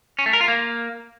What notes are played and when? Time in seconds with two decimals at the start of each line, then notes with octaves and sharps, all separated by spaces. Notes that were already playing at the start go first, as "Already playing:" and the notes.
0.19 C#4
0.26 A3
0.33 A#4
0.41 F4
0.48 A#3